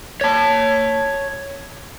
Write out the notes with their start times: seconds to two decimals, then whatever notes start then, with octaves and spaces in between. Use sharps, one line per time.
0.21 C#5 A5